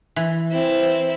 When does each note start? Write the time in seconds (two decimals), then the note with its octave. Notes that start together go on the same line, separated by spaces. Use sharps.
0.16 E3
0.50 C4 E4